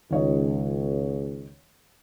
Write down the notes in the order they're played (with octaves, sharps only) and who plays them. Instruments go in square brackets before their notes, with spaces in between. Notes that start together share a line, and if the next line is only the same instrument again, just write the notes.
[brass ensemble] C#2 [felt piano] D#3 C#5 D#5